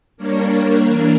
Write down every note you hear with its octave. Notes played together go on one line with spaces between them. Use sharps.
G3 A#3 D4 A#4 C#5
E3 A#3 D4 A#4